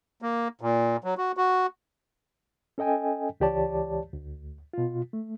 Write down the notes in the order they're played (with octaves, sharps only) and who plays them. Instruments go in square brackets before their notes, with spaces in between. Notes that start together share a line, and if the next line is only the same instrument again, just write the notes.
[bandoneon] A#3
A#2
F#3
F#4
F#4
[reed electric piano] C#4 A4 D#5 G5 G#5
C#2 E3 G4 C#5 D5 A5
D2
B2 F4
A3